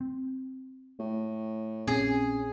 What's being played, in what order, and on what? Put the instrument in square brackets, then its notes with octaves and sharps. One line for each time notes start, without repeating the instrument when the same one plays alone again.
[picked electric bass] C4
[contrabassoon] A2
[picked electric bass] A#1 C4 [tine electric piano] C#4 [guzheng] G#4